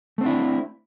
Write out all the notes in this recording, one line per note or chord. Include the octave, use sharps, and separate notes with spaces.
A3 C4 D4 E4